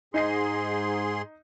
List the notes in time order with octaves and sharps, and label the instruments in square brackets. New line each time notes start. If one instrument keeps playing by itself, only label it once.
[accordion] G#2 G#4 C6 [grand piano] D#4 D#5 C7